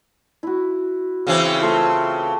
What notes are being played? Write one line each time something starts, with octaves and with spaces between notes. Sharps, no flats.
E4 F#4
C#3 E3 C4 E4 G4
A3 F4 G4